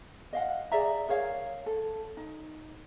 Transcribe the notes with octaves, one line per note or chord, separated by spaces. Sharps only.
D#5 F5 F#5
G#4 D5 E5 A#5
G#4 A#4 C#5 F5
A4
D#4